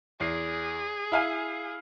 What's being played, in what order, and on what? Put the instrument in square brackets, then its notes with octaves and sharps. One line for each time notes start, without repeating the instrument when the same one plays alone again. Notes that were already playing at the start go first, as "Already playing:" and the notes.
[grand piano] E2 C7 [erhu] G#4
[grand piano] E4 F5 G#5